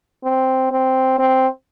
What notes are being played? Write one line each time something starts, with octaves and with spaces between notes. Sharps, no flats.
C4
C4
C4